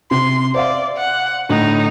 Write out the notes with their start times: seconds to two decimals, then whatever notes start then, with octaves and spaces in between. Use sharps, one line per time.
0.11 C3 C6
0.54 C5 D5 E5 F5
0.97 F#5
1.49 A2 D3 D#4